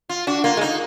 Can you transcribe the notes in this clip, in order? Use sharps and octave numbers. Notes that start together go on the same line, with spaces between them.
F4
D4 F#4
A#3 F4
G#3
A#3 D#4